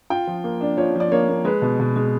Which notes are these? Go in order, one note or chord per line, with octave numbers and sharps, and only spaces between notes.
F4 G5
F3
A#3
D4
F3 C#5
F3
D5
A#3 C#5
A#3
G#3 B4
B2
B2
G#3